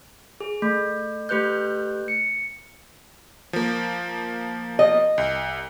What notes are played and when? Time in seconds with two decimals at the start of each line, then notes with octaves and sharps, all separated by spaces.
0.40 G#4
0.62 A3
1.29 A3 G4 B4 F#6 G6
2.08 C#7
3.53 F3 A#3
4.79 D#5
5.18 C2